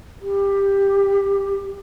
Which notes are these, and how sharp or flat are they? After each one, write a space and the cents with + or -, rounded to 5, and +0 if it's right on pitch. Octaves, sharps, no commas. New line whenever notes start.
G4 +15